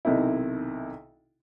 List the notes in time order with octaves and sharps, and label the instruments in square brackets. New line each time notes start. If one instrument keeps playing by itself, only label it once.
[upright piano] B1 C3 D#3 E4